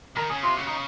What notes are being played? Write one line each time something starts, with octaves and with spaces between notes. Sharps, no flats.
D#3 A#4
C#3 G#4
C3 F4
C#3 F#4
D#4